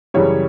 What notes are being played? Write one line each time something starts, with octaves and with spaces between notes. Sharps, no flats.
F#2 C#3 E3 G3 C#5